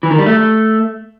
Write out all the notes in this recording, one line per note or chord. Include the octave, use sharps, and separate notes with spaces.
E3
D#3
G3
A3